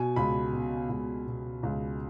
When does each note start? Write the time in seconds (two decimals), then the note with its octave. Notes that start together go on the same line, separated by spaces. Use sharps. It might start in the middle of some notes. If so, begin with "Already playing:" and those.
Already playing: B2 G#5
0.16 C#2 B5
0.53 B2
0.89 C#2
1.27 B2
1.63 C#2